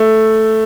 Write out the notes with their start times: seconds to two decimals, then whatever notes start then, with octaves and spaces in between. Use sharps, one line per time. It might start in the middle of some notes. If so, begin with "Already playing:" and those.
Already playing: A3